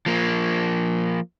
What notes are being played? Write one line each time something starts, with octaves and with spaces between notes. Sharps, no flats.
F3 A#3